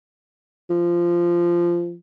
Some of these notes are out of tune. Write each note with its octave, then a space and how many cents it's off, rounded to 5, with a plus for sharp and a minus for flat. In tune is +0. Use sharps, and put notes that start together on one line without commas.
F3 -15